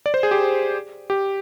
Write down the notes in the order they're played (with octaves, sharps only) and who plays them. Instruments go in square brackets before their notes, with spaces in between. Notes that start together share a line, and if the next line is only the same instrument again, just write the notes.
[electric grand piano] D5
C5
G#4
G4
G4